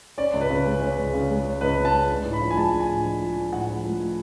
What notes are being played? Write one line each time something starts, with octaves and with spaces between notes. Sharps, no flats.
C#4 D5
C#2
B4
C#3
G#3
C#4
C#2
C#3
G#3
C#4
C#2 B4
C#3
A5
G#3
D4
A2
B5
F3
G#5
G#3 A5
D4
G#5
A2
F3
G#3
D4
A2 F#5
F3
G#3